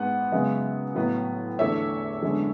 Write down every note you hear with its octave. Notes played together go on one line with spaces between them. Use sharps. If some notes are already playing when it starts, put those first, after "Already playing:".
Already playing: G#2 G#3 B3 F#5
F#2 C#3 G#3 B3
A2 F#3 B3
E2 D3 A3 C#5 E5
F#2 D3 G#3 B3